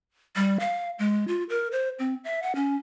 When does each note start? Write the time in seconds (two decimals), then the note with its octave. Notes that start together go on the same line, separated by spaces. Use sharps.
0.36 G3
0.60 F5
0.99 G#3
1.28 F4
1.49 A#4
1.72 C5
1.99 C4
2.24 E5
2.43 F#5
2.55 C#4